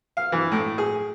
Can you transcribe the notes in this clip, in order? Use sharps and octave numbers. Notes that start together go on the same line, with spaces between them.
F5
E3
A2
G#4